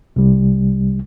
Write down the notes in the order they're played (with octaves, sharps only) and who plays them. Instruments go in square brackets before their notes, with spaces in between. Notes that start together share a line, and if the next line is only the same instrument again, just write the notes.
[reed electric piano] C2 C3 G3